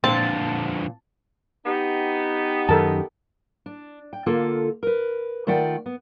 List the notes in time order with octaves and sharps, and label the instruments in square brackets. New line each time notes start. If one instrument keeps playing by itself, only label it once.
[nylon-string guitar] A#2 B3 [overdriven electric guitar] D3 F3 [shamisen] C4 [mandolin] A5
[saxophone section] B3 D#4 [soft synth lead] G4
[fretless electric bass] F#2 D#3 [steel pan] A4 A#4 A5
[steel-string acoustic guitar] D4
G5
D3 A#3 F4 A4
A#4 B4
D#3 A3 F4 D5 F#5 G5
B3